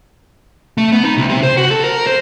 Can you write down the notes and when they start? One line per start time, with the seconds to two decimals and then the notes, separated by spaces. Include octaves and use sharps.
0.78 A3
0.92 B3
1.05 D#4
1.17 C2
1.29 C3
1.43 C5
1.57 F#4
1.71 A4
1.84 A#4
2.07 C5